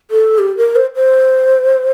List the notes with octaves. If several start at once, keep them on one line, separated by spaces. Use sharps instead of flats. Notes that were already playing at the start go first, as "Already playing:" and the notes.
A4
G4
A#4
C5
C5